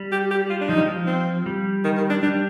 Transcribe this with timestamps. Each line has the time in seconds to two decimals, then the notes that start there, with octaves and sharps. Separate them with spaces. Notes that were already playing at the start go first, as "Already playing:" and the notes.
Already playing: G3
0.12 G4
0.31 G4
0.50 F4
0.61 D4
0.69 F3 D#4
0.78 G3
0.86 F3
1.07 C4
1.46 G3
1.84 D#3
1.97 D#3
2.10 D4
2.22 G3 D4